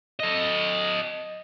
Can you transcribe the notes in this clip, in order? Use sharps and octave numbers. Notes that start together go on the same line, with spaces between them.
A4 D#5